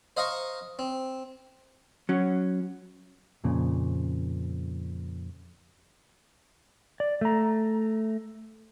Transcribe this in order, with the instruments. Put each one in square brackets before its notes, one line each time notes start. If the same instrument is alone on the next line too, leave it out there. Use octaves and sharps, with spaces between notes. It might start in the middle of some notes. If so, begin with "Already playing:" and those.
[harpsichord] C5 D#5 F5 A#5 C#6
C4
[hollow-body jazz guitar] F#3 C#4
F2 A#2 C#3
[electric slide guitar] D5
A3 A#5